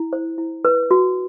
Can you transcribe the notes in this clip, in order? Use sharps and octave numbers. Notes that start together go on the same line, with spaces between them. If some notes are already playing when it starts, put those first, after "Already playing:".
Already playing: E4
C5
E4
B4
F#4